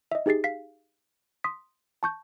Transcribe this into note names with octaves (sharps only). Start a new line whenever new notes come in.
D#5 E5
D#4 G4 G#4 A6 C7
F5 B6 C7
C6 D#6 B6
A5 C#6 G6